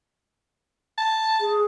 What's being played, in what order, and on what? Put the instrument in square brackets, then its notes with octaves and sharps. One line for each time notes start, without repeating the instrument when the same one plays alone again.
[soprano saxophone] A5
[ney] G#4